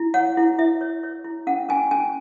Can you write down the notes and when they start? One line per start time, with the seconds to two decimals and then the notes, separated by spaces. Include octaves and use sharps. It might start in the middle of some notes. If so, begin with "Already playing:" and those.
Already playing: E4
0.14 C#5 F#5
0.37 E4
0.59 E4 E5
0.81 C#5
1.03 C#5
1.24 E4
1.47 C#4 F#5
1.69 C#4 G#5
1.91 C#4 G#5